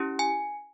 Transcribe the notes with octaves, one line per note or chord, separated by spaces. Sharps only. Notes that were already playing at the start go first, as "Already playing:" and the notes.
Already playing: C#4 E4 G4
G#5